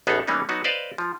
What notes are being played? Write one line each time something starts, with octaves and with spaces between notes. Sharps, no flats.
A1 E2 B3 D#4 G#4 A4
E3 G3 A#3 B3 C#4 D#4
F#3 B3 D#4 F#4
B4 C5 D5 D#5 F5
F3